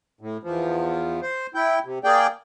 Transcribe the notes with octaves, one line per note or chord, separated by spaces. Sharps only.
A2
E2 F3
C5
E4 G5
C3
A#3 G#4 D5 G5